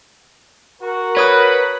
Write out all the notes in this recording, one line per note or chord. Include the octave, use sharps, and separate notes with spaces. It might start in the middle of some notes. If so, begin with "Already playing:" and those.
F#4 A#4
B4 C#5 D#6 F#6